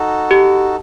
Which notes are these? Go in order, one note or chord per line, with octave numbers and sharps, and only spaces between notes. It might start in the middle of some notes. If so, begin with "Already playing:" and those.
Already playing: D#4 F#4 A4
G4